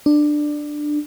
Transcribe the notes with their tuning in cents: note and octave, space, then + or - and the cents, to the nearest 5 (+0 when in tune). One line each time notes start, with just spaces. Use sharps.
D4 +15